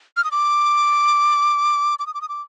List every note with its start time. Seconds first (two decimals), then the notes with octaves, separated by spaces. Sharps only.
0.17 F6
0.24 D#6
0.31 D6
1.99 D6
2.07 D#6
2.14 D6
2.21 D#6
2.29 D6